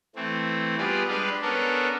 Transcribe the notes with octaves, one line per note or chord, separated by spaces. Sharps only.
E3 A3 C4
G3 B3 F4 G#4 D5
G3 G#3 D4 B4 F5
B3 C#4 D4 A4 A#4